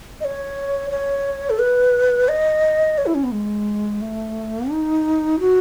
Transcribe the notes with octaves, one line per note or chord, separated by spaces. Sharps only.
D#5
C#5
C#5
A4
B4
D#5
C#5
E4
C#4
B3
G#3
A3
D#4
F#4